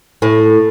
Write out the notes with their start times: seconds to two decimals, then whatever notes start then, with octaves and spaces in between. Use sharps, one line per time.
0.22 A2